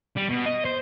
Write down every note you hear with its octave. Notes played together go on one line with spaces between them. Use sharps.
G3
B2
D#5
C5